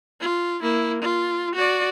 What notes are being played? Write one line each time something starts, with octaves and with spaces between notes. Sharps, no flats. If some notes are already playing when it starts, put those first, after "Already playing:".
F4
A#3 E4
F4
F#4 D5